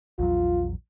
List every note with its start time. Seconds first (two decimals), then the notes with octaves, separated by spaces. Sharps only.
0.19 A#1 E2 F#3 F4